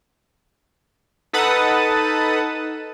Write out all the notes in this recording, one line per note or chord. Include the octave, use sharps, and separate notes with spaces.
D#4 A4 B4 F#5 A5 D#6